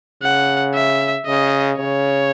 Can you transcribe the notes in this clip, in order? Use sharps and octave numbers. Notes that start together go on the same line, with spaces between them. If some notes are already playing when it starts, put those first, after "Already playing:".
C#3 F#5
E5
C#3 D#5
C#3 C#5